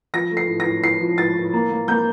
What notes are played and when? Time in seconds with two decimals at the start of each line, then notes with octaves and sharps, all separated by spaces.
0.14 F3 A#6
0.31 A3
0.37 C7
0.48 A2
0.60 A#6
0.66 A2
0.84 A2 C7
1.00 F3
1.18 A2 A6
1.36 A2
1.53 A#3
1.70 A#3
1.88 A#3 G6